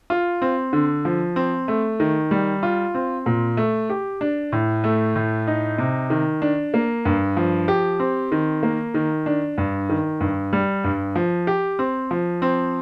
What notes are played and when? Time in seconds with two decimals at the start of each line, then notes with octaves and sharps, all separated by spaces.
0.10 F4
0.42 C4
0.73 D3
1.05 F3
1.36 C4
1.68 A3
2.00 D#3
2.31 G3
2.63 F4
2.95 C4
3.26 A#2
3.57 A3
3.90 G4
4.21 D4
4.52 A2
4.84 A3
5.16 A2
5.47 D#4
5.78 C3
6.10 D#3
6.42 D4
6.74 A#3
7.05 G2
7.37 F3
7.68 G4
8.00 C4
8.32 D#3
8.63 A#3
8.94 D#3
9.26 D4
9.58 G2
9.89 D#3
10.21 G2
10.53 G3
10.84 G2
11.16 F3
11.47 G4
11.79 C4
12.11 F3
12.42 C4